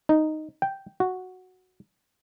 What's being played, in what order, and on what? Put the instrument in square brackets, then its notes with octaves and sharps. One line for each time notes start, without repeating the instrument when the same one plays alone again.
[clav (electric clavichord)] D#4
G5
F#4